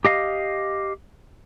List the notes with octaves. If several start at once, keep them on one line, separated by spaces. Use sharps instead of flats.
G4 D#5 F5